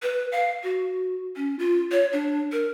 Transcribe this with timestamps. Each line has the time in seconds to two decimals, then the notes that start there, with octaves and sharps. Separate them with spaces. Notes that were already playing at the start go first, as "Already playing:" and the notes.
0.03 B4
0.32 F5
0.63 F#4
1.36 C#4
1.59 F4
1.92 C#5
2.13 D4
2.53 A#4